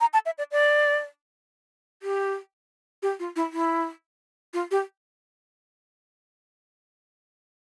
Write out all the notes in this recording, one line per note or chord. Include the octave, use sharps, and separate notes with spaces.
A#5
A5
E5
D5
D5
G4
G4
F4
E4
E4
F4
G4